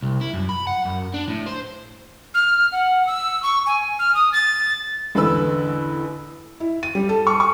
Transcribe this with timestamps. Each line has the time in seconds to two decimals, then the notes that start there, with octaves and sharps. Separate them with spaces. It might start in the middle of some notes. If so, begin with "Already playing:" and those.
0.03 C2
0.21 E4
0.34 F#2
0.49 B5
0.67 F#5
0.85 F#2
1.14 D4
1.28 A2
1.46 C5
2.34 F6
2.72 F#5
3.07 E6
3.43 C#6
3.66 G#5
3.99 F6
4.15 D#6
4.33 A6
5.15 A1 E2 D3 B4 B5 E6
6.60 E4
6.83 D#7
6.95 G3
7.09 A4
7.27 C#6
7.40 C#6